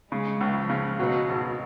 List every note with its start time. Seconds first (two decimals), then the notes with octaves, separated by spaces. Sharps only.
0.11 C#3 G#3
0.41 C#2
0.56 F3
0.69 C#3
0.99 B2 F#3
1.29 G#1